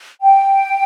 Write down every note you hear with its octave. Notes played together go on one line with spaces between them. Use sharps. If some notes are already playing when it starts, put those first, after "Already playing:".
G5